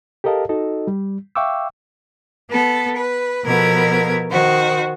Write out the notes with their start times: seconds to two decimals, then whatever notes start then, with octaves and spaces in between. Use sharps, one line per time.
0.24 G4 A4 A#4 D#5 F5 A5
0.49 D#4 F#4 A4 D#5
0.87 G3
1.35 E5 F5 G5 C#6 D6 E6
2.50 B3 A4
2.96 B4
3.45 B2 F3 B3 A4 A#4 G#6
4.31 D#3 F#4 C5